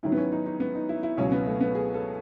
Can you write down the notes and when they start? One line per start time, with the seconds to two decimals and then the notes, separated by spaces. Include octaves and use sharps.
0.03 G#2 D#3 F#3 E4
0.12 B3
0.18 C#4
0.32 D#4
0.46 D#4
0.60 B3
0.75 D#4
0.89 E4
1.03 E4
1.17 C#2 B2 F#3 C#4
1.32 B3
1.47 A3
1.61 B3
1.75 G#4
1.94 A4